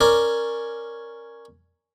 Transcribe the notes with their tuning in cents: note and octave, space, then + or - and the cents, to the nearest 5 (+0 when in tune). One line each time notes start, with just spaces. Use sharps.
C#4 +0 A#4 +0 D5 +0